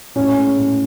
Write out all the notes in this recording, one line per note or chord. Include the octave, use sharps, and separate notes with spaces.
A2 C#4
G#3
A2